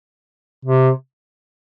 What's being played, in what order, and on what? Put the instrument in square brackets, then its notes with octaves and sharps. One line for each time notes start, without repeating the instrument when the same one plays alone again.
[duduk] C3